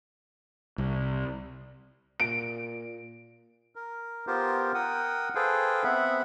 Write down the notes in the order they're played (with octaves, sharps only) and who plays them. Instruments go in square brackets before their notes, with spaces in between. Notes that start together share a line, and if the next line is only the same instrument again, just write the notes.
[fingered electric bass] C2
[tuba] A#2 [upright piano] D7
[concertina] A#4
B3 F4 G4 A#4 C5
A#4 F#5 G5 D#6
G#4 A4 B4 C5 F5 G5
B3 C4 E5 F#5 B5